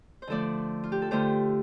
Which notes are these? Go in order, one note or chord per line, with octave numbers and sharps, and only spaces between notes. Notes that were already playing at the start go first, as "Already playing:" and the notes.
C5
D3 F3 A3 A4 D5
F4
G4
A4
D3 A3 F4 G4 C5